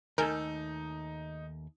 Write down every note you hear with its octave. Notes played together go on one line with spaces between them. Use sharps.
D#2 A3 D#4 A4 A#4 G#5 F6 G6